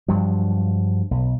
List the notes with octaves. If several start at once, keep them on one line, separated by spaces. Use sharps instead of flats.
G2 F3 F#3
B1